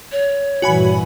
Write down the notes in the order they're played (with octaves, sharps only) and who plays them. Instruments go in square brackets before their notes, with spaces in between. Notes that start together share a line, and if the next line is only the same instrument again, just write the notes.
[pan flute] C#5
[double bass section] G2 A#2 E3 [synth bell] F#4 G#5 B5